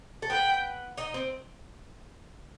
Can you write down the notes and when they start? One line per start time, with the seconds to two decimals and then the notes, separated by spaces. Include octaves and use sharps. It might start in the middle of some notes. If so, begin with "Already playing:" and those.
0.22 A4
0.30 B3 B4 G5
0.98 D#4 D#5
1.14 C4